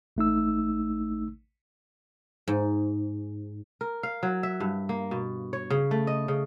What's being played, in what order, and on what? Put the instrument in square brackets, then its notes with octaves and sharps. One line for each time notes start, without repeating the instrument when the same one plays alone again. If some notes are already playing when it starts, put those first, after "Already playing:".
[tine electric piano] A1 A3 D#4 E6
[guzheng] G#2
[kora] A#4
F5
F#3
E5
G2
A#3
B2
C#5
C#3
A3
D#5
C#3